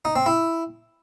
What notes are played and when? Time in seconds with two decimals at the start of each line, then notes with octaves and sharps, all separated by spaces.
0.05 D#4
0.16 C4
0.26 E4